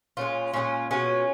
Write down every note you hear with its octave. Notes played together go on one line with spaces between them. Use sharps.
A#2 G#3 C#4 F4
A#2 F3 G#3 C#4 F4
B2 G#3 C#4 F4